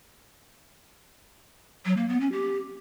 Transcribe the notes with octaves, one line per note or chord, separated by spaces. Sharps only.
F#3
A#3
B3
C#4
G4